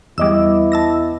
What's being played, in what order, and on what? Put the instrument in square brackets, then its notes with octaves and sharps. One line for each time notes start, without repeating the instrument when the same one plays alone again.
[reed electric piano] E2 D#5 D6 [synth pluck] G3 E6 [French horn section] B3 E4
[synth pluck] A5 E6 A#6